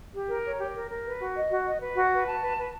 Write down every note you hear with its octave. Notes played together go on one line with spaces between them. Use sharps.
G4
A#4
C#5
G4
A#4
A#4
B4
F#4
D#5
F#4
D#5
B4
F#4
B4
A5
B4
B4